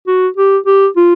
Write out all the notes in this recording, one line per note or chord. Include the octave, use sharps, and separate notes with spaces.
F#4
G4
G4
F4